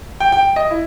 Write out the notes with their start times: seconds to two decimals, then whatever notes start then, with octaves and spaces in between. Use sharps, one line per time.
0.20 G5
0.32 G5
0.56 D#5
0.71 E4